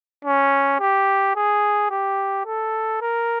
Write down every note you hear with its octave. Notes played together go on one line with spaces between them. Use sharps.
C#4
G4
G#4
G4
A4
A#4